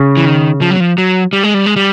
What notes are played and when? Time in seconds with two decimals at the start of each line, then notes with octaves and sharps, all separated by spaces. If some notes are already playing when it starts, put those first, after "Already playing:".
Already playing: C#3
0.17 E3
0.26 D#3
0.61 F3
0.71 F#3
0.80 F3
0.98 F#3
1.33 G3
1.43 G#3
1.54 G3
1.66 G#3
1.76 G3